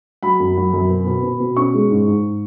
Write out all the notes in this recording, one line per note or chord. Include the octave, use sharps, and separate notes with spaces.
F#3 B5
F#2
F#3
F#2
B2
B2
B2
B2
C#4 C#6
G#3
G#2
G#2